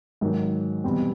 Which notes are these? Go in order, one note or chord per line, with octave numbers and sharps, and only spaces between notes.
G#2 D#3 F#3
E2 B2 G3 C4